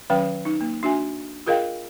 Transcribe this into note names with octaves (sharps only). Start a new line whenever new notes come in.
D#3 F#3 C#4 B4 G5
D#4
A#3
D4 F#4 E5 G#5
F4 G#4 A#4 D#5 F5 G5